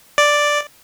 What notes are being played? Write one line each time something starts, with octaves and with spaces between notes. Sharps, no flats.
D5